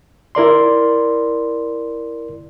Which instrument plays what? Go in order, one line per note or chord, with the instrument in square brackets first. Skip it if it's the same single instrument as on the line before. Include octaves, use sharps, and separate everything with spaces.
[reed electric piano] E4 A#4 D5 C6